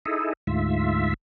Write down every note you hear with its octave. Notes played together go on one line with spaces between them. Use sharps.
D#4 E4 G#4 A4
D2 G#2 F4 E5